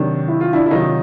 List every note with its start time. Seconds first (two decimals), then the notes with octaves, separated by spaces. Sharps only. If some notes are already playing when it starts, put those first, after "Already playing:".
Already playing: C3 D#3 F#3 D4
0.28 E4
0.41 F4
0.53 D4 E4
0.66 E4
0.71 C3 D#3 F#3 D#4 F4